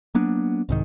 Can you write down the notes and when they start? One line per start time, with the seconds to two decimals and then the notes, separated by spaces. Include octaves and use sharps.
0.15 F#3 A#3 B3 D4
0.69 C2 G#2 D#3